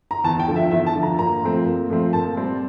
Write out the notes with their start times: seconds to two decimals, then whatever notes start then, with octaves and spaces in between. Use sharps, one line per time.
0.11 A#5
0.24 E2 A5
0.40 G5
0.48 D3 F3
0.56 E5
0.71 E2 E5
0.87 A5
0.95 D3 F3
1.03 A#5
1.19 A#2 A#5
1.43 F3 A3 C4
1.66 A#2
1.90 F3 A3 C4
2.13 A#2 A5
2.37 G3 C4